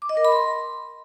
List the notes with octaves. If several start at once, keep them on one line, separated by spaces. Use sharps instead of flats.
D6
D#5
A#4
B5
C6